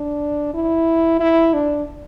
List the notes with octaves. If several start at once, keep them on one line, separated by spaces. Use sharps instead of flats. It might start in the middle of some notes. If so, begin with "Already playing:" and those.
Already playing: D4
E4
E4
D4